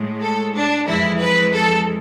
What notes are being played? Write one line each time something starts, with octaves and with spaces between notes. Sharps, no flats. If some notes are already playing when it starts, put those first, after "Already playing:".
Already playing: A2 G#3
A4
D4
F2 E3 G#3 E4
B4
A4